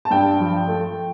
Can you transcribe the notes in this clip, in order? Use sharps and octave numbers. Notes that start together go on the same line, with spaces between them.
A5
G2 G5
F3
A3